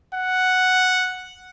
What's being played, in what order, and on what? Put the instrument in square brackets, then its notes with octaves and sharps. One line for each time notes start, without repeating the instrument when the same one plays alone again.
[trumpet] F#5